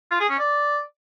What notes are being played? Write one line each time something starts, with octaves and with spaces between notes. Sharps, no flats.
F4
G#4
C#4
D5